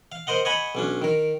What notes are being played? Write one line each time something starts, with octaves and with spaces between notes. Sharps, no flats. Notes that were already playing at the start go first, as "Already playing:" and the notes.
F5
A#4 C5 D#5 F#5
C#5 D#5 F#5 G#5 B5
B1 C#4 D4
D#3 A#4